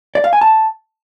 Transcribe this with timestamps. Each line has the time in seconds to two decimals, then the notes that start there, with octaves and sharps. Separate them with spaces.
0.15 D5
0.24 F5
0.33 G#5
0.41 A5